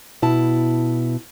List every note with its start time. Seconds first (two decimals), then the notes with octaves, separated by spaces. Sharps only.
0.22 B2 E4 A5